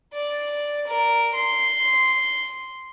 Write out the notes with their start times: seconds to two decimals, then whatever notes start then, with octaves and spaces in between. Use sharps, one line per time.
0.13 D5
0.87 A#4
1.34 C6